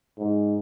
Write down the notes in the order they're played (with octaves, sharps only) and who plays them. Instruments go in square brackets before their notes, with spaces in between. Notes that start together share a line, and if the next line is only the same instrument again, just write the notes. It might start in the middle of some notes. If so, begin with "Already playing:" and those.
[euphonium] G#2